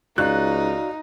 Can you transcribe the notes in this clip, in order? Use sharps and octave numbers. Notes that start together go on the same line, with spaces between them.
C#2 D#4 F#4 D5 F5 F#6